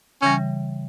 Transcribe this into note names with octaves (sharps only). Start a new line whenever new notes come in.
C#3 E3 G3 C#4